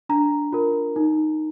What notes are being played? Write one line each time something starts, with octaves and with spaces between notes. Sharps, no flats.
D4 A#5
F4 A#4
D#4